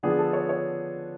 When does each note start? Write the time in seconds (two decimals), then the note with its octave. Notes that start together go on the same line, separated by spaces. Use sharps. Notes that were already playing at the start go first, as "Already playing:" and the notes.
0.03 D3 F3 B3 D4 G#4
0.19 A4
0.33 C#5
0.49 C#5